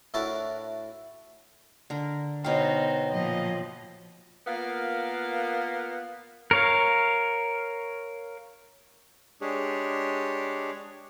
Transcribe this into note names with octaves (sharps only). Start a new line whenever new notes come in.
A2 D4 E4 F#4 A#4 A5
D3 A#4
B2 D#4 C5 C#5 F5 G5
A#2 F3 D#5
A#3 B3 F4 A#4 F5
A#4 C#5 F5
G#3 D4 G4 G#4 C#5